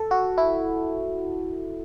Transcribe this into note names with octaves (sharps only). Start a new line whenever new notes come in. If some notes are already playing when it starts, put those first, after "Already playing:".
Already playing: A4
F#4
E4